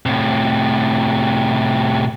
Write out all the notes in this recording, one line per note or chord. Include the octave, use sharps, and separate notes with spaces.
A2 C3